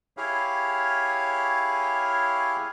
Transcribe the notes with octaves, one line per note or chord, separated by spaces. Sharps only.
E4 G4 G#4 C#5 F5